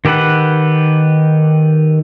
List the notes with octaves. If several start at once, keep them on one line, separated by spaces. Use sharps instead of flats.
D#3 G4 A4 B4 F#5